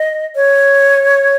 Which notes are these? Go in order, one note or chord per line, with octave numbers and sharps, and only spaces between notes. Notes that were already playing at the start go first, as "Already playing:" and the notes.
Already playing: D#5
C#5